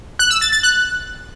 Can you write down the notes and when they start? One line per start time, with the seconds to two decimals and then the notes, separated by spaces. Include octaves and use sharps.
0.19 F#6
0.30 E6
0.41 A6
0.52 A6
0.63 F#6